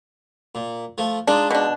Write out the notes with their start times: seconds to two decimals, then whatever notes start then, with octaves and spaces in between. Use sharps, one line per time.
0.55 A#2
0.98 F3 A3
1.27 G#3 D4 D#4 F4
1.51 B2 D4